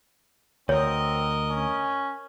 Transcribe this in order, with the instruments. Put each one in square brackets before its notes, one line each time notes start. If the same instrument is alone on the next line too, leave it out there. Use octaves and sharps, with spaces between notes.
[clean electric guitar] D2 [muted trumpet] C4 [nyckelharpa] A#4 D#5 [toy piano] C#5
[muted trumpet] C#4